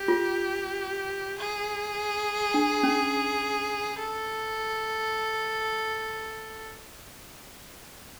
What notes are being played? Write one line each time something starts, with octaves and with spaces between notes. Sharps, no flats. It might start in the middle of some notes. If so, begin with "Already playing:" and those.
Already playing: G4
F4
G#4
D4
C#4
A4